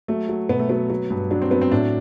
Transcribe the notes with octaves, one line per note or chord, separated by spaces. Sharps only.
F#3 A3
F#3
B2 B3
A3
F#3 B3
F#3
G2
F#3 D4
C4
F#3 B3
C4
A2 D4